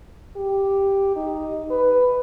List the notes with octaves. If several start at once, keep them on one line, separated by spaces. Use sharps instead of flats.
G4
D#4
B4